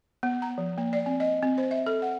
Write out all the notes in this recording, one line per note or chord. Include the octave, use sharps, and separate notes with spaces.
B3
A#5
F3
A#3
D5
C4
D#5
C4
C5
E5
A4
F#5